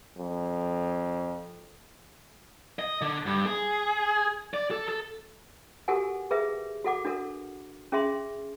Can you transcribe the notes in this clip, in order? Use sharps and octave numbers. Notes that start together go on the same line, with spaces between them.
F2
D#5
D3
G2
G#4
D5
A4
A4
F#4 G4 A4 A#4 F#5 G#5
G#4 A#4 B4 E5
F#4 A4 F#5 D6
D4 F#4 A4 A#4
C#4 G#4 E5 C6